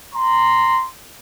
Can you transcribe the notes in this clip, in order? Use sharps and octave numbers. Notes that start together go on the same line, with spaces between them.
A#5 C6